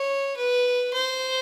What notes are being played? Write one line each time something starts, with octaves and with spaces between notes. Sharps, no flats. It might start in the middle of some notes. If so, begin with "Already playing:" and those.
Already playing: C#5
B4
C5